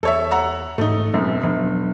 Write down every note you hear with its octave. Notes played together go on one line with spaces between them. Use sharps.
E2 A4 C#5 E5
F#5 A#5 E6
A1 G#2 A3 D#4
E1 F#2 F#3 C4
E1 F3 F#3 D4